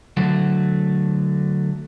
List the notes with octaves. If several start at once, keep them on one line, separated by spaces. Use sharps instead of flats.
D3 F#3 A3